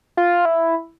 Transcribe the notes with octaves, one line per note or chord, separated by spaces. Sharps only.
F4
E4